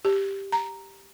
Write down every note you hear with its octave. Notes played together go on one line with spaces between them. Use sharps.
G4
A#5